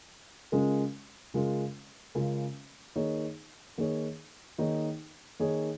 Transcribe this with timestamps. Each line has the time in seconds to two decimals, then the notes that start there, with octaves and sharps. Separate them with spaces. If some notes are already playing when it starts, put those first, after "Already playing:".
0.52 C#3 G#3 C#4 F4 A#4
1.34 C#3 G#3 C#4 F4 A#4
2.15 C#3 G#3 C#4 F4 A#4
2.96 D#3 A#3 D#4 G#4 C#5
3.78 D#3 A#3 D#4 G#4 C#5
4.58 D#3 A#3 D#4 G#4 C#5
5.39 D#3 A#3 D#4 G#4 C#5